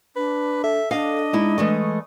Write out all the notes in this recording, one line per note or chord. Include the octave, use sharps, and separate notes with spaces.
D4 B4
A4 E5
D4 D#5 F5
G#3 D#4 E4
E3 G#3 A3 C#6 D#6